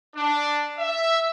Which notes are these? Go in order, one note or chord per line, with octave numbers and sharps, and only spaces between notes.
D4
E5